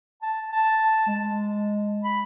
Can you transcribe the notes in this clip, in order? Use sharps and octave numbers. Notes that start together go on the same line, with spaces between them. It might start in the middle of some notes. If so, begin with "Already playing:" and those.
A5
A5
G#3
B5